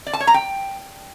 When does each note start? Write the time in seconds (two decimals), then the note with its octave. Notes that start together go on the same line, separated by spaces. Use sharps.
0.07 D5
0.13 A5
0.20 C#5
0.27 A#5
0.34 G5